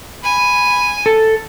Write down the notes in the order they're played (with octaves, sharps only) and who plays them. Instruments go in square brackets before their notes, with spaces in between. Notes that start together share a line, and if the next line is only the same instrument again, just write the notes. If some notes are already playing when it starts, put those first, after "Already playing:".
[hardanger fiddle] G#5 [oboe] B5
[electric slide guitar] A4 [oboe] A5